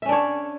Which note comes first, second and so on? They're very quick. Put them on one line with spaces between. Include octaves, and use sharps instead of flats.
E5 C#4 D4 C#5